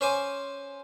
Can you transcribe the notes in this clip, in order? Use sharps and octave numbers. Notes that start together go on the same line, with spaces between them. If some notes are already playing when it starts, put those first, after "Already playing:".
C#4 C5 G#5 D6